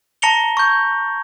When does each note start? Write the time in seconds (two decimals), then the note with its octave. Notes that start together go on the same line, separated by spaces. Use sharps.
0.22 A5 A#5 A#6 C#7 F7 G7
0.57 C#6 G6